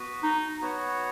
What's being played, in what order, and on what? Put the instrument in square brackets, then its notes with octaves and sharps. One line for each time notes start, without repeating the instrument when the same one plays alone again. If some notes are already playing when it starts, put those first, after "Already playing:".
Already playing: [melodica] B3 F#4 B4
[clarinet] D#4
[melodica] B3 F#4 C#5 F#5